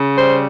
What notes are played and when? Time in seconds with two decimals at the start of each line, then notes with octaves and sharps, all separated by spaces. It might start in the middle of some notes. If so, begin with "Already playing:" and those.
Already playing: C#3
0.18 G3 C5